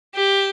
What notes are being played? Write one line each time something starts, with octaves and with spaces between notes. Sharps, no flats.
G4